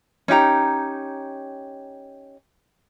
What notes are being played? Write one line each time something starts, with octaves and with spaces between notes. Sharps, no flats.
C#4 D#4 G4 A#5